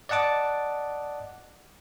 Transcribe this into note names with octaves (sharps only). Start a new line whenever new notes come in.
D5 D#5 F#5 A5 D6